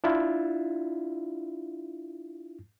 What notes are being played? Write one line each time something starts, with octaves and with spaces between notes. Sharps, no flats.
D4 E4 F4